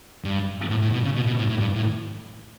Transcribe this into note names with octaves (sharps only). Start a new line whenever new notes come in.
G2
A2
A2
B2
C#3
B2
B2
A2
A2
G2
A2